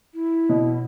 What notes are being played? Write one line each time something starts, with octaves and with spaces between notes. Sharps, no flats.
E4
B2